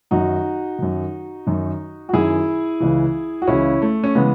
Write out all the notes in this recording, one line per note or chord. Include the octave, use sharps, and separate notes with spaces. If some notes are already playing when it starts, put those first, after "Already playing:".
F#2 D#3 D#4 F#4
F#2 D#3
F#2 D#3
F#4
F#2 D#3 E4 G#4
C#2 C#3 E3
F#4
C#2 C#3 E3 C#4 E4
A3
C#4
C#3 E3 G#3 B3